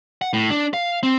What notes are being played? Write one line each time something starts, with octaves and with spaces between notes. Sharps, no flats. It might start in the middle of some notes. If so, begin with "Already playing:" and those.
F#5
A2
D4
F5
C4